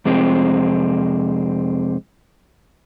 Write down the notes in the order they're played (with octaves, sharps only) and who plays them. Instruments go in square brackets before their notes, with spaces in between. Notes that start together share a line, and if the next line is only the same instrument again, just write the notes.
[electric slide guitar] F2 C3 G#3 C4